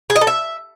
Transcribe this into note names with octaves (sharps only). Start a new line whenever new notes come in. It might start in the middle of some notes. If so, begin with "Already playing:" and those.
G#4
D#5
A4
E5